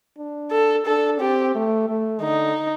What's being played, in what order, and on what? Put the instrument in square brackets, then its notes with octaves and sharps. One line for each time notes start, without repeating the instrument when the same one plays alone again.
[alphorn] D4
[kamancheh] A4
[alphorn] D4 [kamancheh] A4
[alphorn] C4 [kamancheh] G4
[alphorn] A3
A3
[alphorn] D3 [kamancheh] D#4